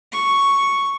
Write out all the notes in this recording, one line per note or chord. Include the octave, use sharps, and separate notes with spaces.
C#6